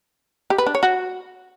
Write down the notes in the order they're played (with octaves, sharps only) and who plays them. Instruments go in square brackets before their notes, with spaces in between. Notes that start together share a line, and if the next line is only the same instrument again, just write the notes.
[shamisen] G4
B4
D4
C#5
F#4